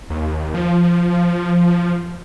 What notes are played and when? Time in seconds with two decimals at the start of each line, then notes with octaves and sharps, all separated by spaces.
0.10 D#2
0.54 F3